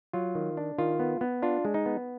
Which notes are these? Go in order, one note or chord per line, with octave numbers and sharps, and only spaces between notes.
F#3 F4
D#3
D4
D#3 F4
B3
B3
D4 F4
G#3
D#4
B3